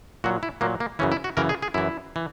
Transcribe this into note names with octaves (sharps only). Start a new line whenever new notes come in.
A#2 F#3 F#4
E4
A#2 F#3 A#3
A#3
F#2 C#3 E3 C#4
E4
F#4
F#2 C#3 E3 A#4
G#4
G#4
F#2 E3 E4
E3